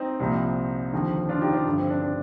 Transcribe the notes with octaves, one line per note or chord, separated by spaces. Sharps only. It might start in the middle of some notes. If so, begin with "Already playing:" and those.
Already playing: C4 D#4
C2 A#2 F3
D#2 D3 F3
D4 F4
D#4 G4
D4 F4
G2 D3 F3
C4
D4
D4